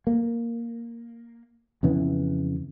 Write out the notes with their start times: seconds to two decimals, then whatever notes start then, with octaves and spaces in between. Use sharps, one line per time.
0.07 A#3
1.83 F2 C#3 E3 B3